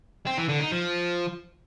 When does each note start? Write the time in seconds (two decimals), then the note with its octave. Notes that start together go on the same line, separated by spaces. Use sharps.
0.27 C4
0.38 E3
0.49 D3
0.60 D#4
0.72 F3